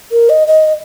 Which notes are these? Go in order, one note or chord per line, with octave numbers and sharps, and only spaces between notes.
A#4
D#5
D#5